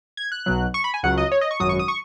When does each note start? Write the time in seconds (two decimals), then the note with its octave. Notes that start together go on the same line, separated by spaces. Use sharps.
0.17 G#6
0.32 F#6
0.46 B1 B2 F#3
0.74 C#6
0.84 B5
0.94 G#5
1.03 C#2 C#3 F#3 F#5
1.17 D#5
1.32 C#5
1.41 D#5
1.51 C#6
1.60 G#1 F#2 F#3 D#6
1.69 C#6
1.79 D#6
1.88 C#6